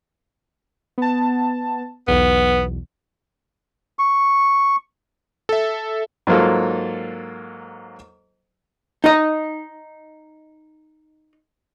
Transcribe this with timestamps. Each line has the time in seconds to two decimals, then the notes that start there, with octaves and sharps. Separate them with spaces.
0.98 B3 A5
2.08 B1 E2 B3
3.99 C#6
5.49 A4 E5
6.27 G#2 F#3 A#3 F4 A4
9.04 D#4 D#5